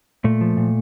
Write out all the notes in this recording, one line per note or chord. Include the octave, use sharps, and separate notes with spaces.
A#2 A3
F3
A#2